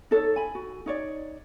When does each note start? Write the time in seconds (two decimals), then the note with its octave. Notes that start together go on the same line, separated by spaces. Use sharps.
0.11 D#4 A4 C#5
0.36 G#5 B5
0.55 F#4
0.86 D#4 C#5 D5